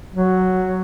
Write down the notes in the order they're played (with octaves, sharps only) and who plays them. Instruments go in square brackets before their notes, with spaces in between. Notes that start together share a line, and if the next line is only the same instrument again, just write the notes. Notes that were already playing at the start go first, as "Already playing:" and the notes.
[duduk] F#3